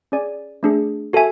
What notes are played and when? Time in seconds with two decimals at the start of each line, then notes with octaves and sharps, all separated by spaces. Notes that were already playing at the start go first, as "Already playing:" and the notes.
0.12 C#4 G#4 D5 G#5
0.63 A3 D4 G#4
1.13 F#4 A4 E5 G#5